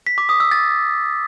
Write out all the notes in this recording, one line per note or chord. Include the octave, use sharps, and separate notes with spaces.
B6
D6
D#6
E6
A6